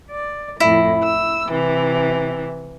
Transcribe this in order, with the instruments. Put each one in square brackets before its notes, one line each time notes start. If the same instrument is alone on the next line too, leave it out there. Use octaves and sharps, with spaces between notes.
[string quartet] D5
[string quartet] F2 A2 [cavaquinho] E4
[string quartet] E6
C3 E3